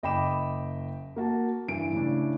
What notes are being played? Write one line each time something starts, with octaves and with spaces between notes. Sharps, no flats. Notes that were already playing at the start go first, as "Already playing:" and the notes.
F#1 D#5 G5 B5 D6 E7
A#3 F#4 A5
G2 E3 D7
A2 C#3 D4